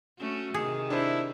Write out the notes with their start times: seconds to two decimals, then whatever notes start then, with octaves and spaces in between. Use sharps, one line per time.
0.18 A3 C#4 F#4
0.54 C3 D#3 G#4
0.90 D4 E4 C5